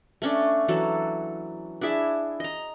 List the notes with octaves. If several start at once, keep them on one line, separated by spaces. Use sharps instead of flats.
A3 C#4 D4
E3 F#3 A4
D4 E4 G#4 E5
D#5 A#5